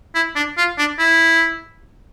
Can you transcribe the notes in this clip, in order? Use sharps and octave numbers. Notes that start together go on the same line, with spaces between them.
E4
D4
F4
D4
E4